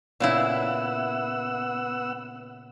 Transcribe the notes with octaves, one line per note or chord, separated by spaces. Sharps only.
A#2 C#3 B3 E4 F#5 E6